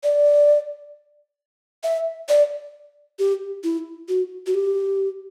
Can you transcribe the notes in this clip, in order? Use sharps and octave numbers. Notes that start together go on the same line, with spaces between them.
D5
E5
D5
G4
E4
F#4
F#4
G4